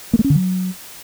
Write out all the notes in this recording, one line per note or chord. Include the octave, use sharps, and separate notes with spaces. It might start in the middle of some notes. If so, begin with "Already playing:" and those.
A#3
A3
C#4
D3
F#3